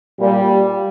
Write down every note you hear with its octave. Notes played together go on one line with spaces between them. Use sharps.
A#2 G3